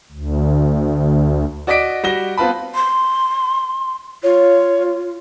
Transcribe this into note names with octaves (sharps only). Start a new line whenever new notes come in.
D2
F#4 D5 D#5 D6 B6 D7
G3 F#4 A#6 G7
B3 C4 F4 B4 A5 B5
C6
F4 C#5